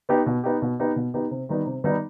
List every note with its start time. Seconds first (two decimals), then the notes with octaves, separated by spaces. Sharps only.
0.09 B3 D#4 G4
0.26 B2
0.44 B3 D#4 G4
0.62 B2
0.80 B3 D#4 G4
0.96 B2
1.14 B3 D#4 G4
1.31 C3
1.49 D#3 G3 B3 D#4
1.66 C3
1.84 D#3 G3 B3 D#4